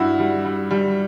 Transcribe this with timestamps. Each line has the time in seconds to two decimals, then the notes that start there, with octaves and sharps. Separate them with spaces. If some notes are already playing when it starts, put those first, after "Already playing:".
Already playing: G2 E4 F#4
0.19 G3
0.45 G3
0.71 G3